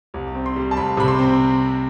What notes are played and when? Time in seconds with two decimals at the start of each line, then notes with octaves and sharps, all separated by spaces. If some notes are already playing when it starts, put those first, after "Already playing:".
0.14 C2
0.35 C4
0.46 C6
0.56 G3
0.71 A5
0.77 C2 B5
0.97 C3 B5
1.08 C6
1.18 C4